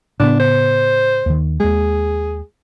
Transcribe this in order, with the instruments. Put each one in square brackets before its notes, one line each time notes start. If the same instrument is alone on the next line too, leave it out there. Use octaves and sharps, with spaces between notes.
[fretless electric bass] A2 C#3 B3 [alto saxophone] D4
[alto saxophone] C5
[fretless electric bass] D#2 D#3
[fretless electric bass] D#2 G#3 [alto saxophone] G#4